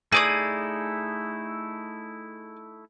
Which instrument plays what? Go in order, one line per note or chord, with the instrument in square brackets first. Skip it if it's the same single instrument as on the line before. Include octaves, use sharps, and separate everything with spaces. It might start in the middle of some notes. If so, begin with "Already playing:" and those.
[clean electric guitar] A3 D#4 E4 [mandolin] G#4 D5 D#6